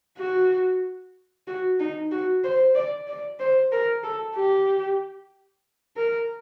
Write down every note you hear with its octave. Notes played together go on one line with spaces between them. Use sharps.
F#4
F#4
D#4
F#4
C5
D5
D5
C5
A#4
A4
G4
A#4